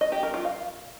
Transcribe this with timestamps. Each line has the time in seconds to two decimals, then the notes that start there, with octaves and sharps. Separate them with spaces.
0.01 D#5
0.12 G4
0.23 A#4
0.34 F4
0.45 F5